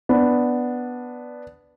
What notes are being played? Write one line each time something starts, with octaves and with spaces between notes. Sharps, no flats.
B3 D4